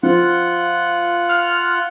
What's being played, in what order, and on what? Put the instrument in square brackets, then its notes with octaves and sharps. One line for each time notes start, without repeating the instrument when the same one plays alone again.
[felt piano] F3 [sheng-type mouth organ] F4 F#5
[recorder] F6